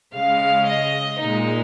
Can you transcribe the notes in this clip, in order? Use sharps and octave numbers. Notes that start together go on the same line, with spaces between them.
C#3 G#3 F5
D#5
A#2 G#3 D#4